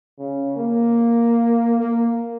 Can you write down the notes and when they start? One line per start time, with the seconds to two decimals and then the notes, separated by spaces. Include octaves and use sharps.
0.19 C#3
0.56 A#3
1.80 A#3